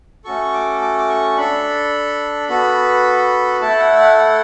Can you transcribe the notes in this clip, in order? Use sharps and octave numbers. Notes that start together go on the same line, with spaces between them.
A3 C#4 F#4 A4 C#6
D6
D6
D6
C#6
D4 A4 B5
B3 F#4 A4
A3 E4 A4 A5
F#5
F#5
F#5